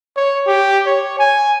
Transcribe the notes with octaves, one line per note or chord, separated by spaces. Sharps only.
C#5
G4
C#5
G#5